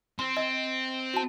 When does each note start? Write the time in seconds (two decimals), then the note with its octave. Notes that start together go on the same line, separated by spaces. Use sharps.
0.19 C4 C6
0.37 D#5
1.14 F#4 A5